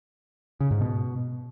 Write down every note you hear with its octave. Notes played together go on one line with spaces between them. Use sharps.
C#3
G#2
B2